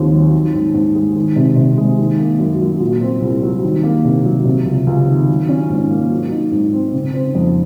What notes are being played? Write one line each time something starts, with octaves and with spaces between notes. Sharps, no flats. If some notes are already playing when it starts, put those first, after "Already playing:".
Already playing: D#2 D#3 F3 C4
F#3
D#3
G#2
G#2
G#3
D#3
C3
C3
G#3
D#3
A#3
F#2
F#3
A#2
C4
C2
F#3
D#3
A#3
C3
F#3
C3
C#2
C#2
D#3
F#3
C#4
G#2
A#3
F#3
D#4
G#2
C4
C#3
C4
F2